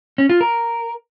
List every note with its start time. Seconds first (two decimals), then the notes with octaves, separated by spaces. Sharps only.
0.18 C#4
0.29 F4
0.41 A#4